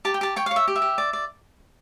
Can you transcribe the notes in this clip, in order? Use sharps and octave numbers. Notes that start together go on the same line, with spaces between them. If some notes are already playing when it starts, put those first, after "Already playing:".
G4 A5
G5
G4 A5
C#5 G5
F5
C#5
E5
G4
E5
G4
D5
D5